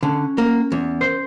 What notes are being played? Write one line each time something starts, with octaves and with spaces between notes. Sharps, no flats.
D3 C#4
A#3
E2
C5